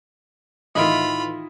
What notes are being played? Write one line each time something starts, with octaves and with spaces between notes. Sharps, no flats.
A2 D#3 E3 E4 F4 D#5 B5 D7